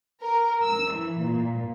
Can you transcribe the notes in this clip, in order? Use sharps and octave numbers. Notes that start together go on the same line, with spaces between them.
A#4
E6
E3
A#2